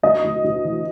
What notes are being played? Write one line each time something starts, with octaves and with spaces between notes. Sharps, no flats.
D2 D#5
D2
D2
E3